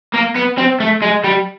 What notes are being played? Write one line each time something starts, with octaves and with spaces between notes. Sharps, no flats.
A#3
B3
C4
A3
G#3
G3